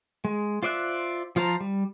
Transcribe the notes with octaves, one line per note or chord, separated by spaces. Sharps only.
G#3
F4 C5 D5 E5 F#6
F3 F4 C5 A5 A#5
G3